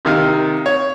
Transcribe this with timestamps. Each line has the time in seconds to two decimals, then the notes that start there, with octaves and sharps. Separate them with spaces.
0.05 C3 D#3 F5
0.66 C#5